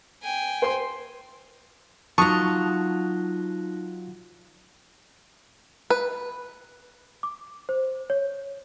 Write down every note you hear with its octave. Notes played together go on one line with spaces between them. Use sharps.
G5 G#5
C5 C6
F#3 D#4 F4 A5 C#6 D#6 F#6 A#6
B4
D6
C5
C#5